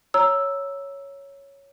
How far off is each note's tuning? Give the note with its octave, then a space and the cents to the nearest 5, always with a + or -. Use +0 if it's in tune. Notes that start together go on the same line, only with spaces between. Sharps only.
C#5 +0 A#5 +0 E6 +0